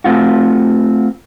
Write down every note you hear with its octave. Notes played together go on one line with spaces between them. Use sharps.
A3 C4 F4 F#4